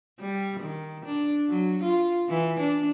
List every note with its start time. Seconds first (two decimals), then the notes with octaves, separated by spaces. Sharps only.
0.20 G3
0.60 D#3
1.06 D4
1.50 F#3
1.83 F4
2.30 E3
2.60 D4